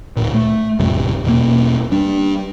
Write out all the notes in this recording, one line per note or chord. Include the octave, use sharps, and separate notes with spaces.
D1 B1 A#2
A3
A1 F2 C3 G3
E2 B2 A#3
G3 D4